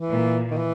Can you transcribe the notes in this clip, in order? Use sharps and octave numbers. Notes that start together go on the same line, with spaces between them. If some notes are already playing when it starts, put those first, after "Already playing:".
Already playing: E3
A#2
D#3
E3